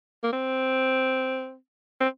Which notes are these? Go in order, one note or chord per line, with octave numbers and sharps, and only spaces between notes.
A#3
C4
C4